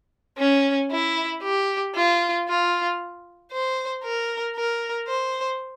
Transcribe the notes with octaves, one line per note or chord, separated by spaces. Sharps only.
C#4
E4
G4
F4
F4
C5
A#4
A#4
C5